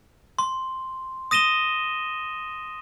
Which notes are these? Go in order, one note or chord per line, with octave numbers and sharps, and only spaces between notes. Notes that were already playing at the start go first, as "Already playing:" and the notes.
C6
D#6 A#6 D#7 E7 G7